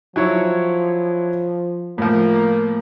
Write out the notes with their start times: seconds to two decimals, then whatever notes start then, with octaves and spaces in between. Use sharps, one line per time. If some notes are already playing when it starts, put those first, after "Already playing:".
0.16 F3 F#3 E4 C#5
1.98 A2 F3 A#3